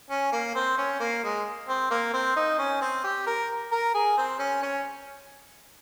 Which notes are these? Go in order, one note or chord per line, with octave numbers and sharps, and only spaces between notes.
C#4
A#3
C4
C#4
A#3
G#3
C4
A#3
C4
D#4
C#4
C4
G4
A#4
A#4
G#4
C4
C#4
C#4